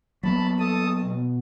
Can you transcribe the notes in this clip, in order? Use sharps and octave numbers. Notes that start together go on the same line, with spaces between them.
F#3 A#3 B3 A5 B5
A4 A5 D#6
B2